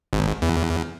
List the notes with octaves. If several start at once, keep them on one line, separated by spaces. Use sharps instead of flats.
G#1
E2